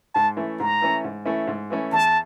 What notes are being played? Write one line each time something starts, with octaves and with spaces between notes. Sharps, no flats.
G#2 A5
E3 A3 C#4 E4
G#2 A#5
E3 A3 C#4 E4
G#2
E3 A3 C#4 E4
G#2
E3 A3 C#4 E4
E2 A5